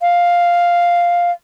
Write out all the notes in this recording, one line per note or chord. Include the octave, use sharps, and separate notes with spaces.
F5